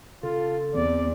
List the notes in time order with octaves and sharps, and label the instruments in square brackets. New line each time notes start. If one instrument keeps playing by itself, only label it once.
[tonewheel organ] C#3 A4 [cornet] F4
[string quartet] E2 [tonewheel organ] C4 [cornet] D5